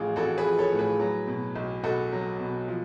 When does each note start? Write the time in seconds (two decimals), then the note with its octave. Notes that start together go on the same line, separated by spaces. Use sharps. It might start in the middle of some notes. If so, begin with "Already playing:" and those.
Already playing: A1 A2 F3 F4 F#4 G#4
0.16 A1 F#4 A4
0.38 G#4 B4
0.44 F3
0.58 A4 C#5
0.73 A2
0.79 G#4 B4
1.00 F#3
1.27 B2
1.56 B1
1.83 B1 F#4 A4
2.12 F#3
2.40 B2
2.68 F3